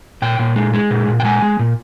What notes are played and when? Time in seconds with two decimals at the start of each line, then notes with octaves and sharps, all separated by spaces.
0.22 A#2 G5
0.39 A#2
0.56 G#3
0.74 G#3
0.91 A#2
1.08 A#2
1.20 G5
1.24 G#3 G#5
1.42 G#3
1.59 A#2